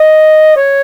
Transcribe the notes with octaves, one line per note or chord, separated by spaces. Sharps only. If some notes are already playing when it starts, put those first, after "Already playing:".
Already playing: D#5
C#5